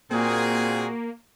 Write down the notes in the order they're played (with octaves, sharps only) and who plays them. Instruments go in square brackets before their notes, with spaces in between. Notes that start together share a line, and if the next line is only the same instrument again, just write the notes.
[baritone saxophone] A#2 [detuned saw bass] A#3 [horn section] C4 F#4 G#4